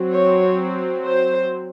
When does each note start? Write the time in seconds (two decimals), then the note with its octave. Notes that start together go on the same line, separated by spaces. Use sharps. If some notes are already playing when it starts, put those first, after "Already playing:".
Already playing: F#3 C4
0.12 C#5
1.05 C5